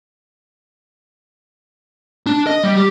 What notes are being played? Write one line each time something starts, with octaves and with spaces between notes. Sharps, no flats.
D4
D#5
G3
G4